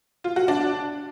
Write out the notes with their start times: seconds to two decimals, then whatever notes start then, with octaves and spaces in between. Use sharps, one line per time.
0.24 F4
0.36 F#4
0.48 D4